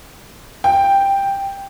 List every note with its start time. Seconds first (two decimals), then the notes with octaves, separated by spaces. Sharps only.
0.64 G5